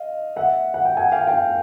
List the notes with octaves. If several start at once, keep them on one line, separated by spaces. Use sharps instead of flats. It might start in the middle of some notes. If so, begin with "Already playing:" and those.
Already playing: D#5 F5
E5 F#5
F#5
G5
F#5 G#5
F5 G5
F5 G5